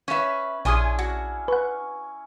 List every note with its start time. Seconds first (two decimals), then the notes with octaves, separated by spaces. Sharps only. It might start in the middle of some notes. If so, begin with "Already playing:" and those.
0.08 C#4 B4 C#5 E5
0.65 A#1 C#4 D4 E4 G#4 G#5 C6 D#6
0.99 F#4
1.48 B4 F#5 C#6